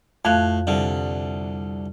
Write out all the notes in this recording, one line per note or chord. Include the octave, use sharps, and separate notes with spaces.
F2 A2 F5 F#6
C2 D3